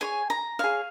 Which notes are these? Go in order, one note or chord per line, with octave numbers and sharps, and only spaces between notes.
G#4 C#5 G#5
A#5
G#4 C#5 F5